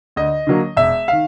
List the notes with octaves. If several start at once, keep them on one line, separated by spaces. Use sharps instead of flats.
D2 D#5
D3 F#3 A#3
E1 E5
D#3 F5